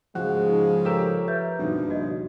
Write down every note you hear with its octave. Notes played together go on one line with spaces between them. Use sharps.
G#2 C#3 F3 G#3 F#4 F#6
D#4
G4 A4 A#4 C#5 E6 E7
B4 E5 G6
F#1 G2 B2 D#3 F3
F#4 D#5